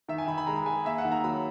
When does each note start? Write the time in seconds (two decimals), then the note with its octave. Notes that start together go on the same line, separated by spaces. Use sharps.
0.08 D#3 E5
0.18 G#5
0.28 D#3 B5
0.38 B5
0.47 G#3 A#5
0.66 G#3 G#5
0.85 A#3 E5
0.98 F#5
1.05 D#3
1.12 A#5
1.24 F#3 B5